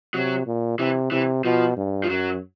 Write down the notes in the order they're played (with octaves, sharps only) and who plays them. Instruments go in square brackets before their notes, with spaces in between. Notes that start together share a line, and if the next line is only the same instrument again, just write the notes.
[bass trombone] C3 [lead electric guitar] F#3
[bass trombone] A#2
[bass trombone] C3 [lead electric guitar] E3
[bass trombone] C3 [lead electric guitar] E3
[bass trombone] B2 [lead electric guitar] F3
[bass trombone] G2
[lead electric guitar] F3
[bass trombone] F#2 [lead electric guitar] F#3